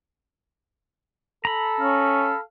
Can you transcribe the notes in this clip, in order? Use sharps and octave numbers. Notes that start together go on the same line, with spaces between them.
A4 A#5 B5
C#4 F5